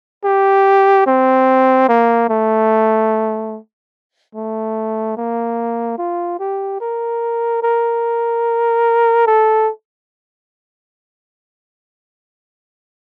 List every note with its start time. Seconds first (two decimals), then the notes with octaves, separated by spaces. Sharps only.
0.25 G4
1.07 C4
1.89 A#3
2.30 A3
4.35 A3
5.17 A#3
5.99 F4
6.40 G4
6.81 A#4
7.63 A#4
9.27 A4